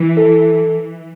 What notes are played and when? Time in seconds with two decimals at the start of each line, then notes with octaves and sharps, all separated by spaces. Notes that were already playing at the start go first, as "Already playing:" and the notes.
Already playing: E3
0.17 A4